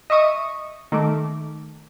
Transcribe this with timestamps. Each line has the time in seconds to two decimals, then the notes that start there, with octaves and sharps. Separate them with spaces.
0.10 D#5 E5 C#6 D#6
0.92 D#3 A3 D6